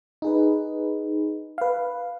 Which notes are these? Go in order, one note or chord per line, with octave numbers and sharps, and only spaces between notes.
D#4 G#4 B4
B4 F5